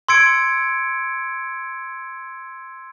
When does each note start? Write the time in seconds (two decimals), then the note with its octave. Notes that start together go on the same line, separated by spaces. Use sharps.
0.09 C6 E6 G#6 C#7 D7